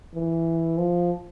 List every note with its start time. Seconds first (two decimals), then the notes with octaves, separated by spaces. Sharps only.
0.14 E3
0.78 F3